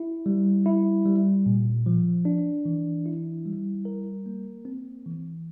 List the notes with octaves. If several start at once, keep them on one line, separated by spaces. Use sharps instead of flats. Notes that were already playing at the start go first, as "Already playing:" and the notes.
Already playing: E4
G3
E4
G3
A#2
F3
D4
E3
E4
G3
A#4
A#3
C4
E3